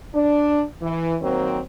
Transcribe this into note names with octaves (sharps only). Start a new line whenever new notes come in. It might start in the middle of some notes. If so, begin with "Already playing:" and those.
D4
E3
D#3 F#3 A#3 C4